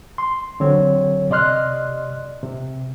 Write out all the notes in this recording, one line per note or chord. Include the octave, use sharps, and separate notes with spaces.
C6
D3 F#3 C4 C#5
C3 D5 D#5 C6 F6 F#6
C3